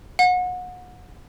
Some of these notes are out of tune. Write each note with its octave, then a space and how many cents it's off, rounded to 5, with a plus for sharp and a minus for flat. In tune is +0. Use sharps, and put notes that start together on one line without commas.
F#5 -30